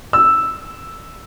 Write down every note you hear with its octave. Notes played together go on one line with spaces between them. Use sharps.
E6